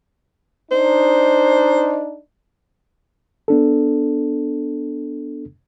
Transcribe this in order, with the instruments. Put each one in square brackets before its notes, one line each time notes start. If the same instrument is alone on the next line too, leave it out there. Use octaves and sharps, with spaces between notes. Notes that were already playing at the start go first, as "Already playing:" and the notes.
[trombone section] D4 D#4 [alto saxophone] C5
[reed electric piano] B3 D4 A4